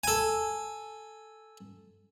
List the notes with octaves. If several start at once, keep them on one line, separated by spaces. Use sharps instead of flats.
A4 G#5